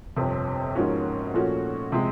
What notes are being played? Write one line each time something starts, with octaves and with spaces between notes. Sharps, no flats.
G1 F2 C3
G#2 F3 A#3 C#4 F#4
A#2 F3 A3 C#4 F#4
C3 F3 G#3